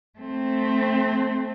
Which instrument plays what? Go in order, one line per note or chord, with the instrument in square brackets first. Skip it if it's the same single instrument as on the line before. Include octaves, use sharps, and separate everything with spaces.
[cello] A3 C4